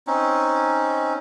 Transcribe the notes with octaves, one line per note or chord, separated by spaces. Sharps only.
C4 C#4 D#4